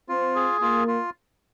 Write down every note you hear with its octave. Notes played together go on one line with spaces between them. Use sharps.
C4 F4
G#4
A#3 F4
F4